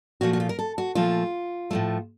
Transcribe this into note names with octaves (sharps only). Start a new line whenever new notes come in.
A#2 F3 A3 F#4
F#4
F4
A#4
A4
F#4
A#2 F3 A3 F4
A2 F3 A3